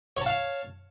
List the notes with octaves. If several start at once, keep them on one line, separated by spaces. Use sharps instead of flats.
C#5 F5 A5